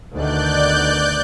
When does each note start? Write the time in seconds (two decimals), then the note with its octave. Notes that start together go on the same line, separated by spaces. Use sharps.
0.14 D2 B2 D#3 D5 F#6 G6